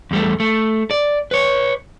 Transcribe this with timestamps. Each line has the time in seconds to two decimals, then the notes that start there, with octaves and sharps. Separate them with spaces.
0.11 E2 G3 A3
0.40 A3
0.91 D5
1.31 B4 C#5